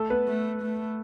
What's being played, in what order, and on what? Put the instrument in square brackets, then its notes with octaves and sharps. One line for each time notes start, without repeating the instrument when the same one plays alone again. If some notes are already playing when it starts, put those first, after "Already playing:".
Already playing: [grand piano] A3 A4
B3 B4
[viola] A3
A3